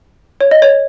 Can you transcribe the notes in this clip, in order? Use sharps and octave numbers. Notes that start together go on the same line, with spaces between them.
C#5
D#5
C#5